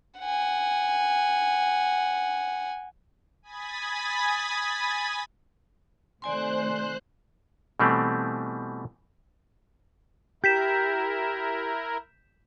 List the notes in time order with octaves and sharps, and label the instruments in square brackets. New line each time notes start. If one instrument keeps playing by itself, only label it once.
[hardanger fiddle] F#5 G#5
[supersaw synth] G#5 B5 D#6 G#6 A6 B6
[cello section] C3 D#3 A3 [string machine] C5 F#6 [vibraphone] D5 G#5 C6
[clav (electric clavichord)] B2 E3 G3 A3 C4
[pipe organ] E4 A#4 [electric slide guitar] G4 [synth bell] G6 B6 E7